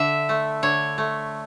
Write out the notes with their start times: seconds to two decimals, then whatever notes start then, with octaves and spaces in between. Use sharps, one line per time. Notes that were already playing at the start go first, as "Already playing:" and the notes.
Already playing: D3 E5
0.29 A3
0.63 D3 C#5
0.98 A3